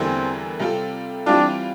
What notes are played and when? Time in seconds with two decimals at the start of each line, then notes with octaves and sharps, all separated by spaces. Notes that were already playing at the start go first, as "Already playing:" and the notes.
Already playing: E2 D3 G3 A#3 C4 E4
0.59 C3 G3 C4 F4 A4
1.26 E3 G3 C4 D4 F4